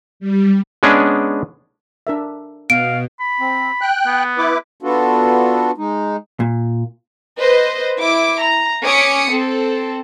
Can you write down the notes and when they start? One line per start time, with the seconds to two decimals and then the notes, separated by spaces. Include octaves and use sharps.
0.20 G3
0.83 G#3 B3 C#4 D4 G#4
2.07 D4 A#4 E5
2.70 B2 F5 D7
3.20 B5
3.40 C4
3.81 G5 F#6
4.07 B3
4.38 E4 B4 D6
4.83 B3 D4 F4 F#4 A4
5.78 G#3 D#4
6.40 A#2
7.39 B4 C5 D#5
7.98 E4 D6
8.42 A#5
8.84 C#4 D6 D#6 B6 C#7
9.31 C4 A4